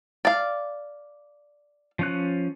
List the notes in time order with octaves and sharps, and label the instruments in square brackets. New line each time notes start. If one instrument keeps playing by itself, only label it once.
[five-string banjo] D5 F5
[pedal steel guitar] F3 C#4 F#6